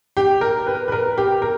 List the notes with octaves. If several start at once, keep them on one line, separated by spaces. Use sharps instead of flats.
G4
A#4
B4
B4
A#4
G4
A#4